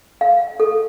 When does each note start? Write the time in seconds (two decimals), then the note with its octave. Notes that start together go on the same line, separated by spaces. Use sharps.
0.21 F5
0.60 A4